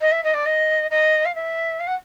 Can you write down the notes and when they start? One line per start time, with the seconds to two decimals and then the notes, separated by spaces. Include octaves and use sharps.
0.01 D#5
0.12 E5
0.24 D#5
0.34 D5
0.46 D#5
0.91 D#5
1.25 F5
1.35 E5
1.80 F5
1.87 F#5